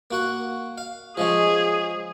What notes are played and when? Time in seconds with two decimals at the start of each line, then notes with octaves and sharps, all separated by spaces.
0.11 A#3 F#4 F#5
0.78 F5
1.17 F3 G#3 C#4 G#4